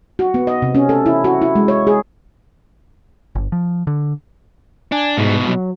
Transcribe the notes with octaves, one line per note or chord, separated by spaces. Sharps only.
F#4
B3
D#5
C3
C#4
A4
E4
F#4
E4
G#3
C#5
G#4
G1
F3
D3
D4 G#5
C2 G#2 B2
F#3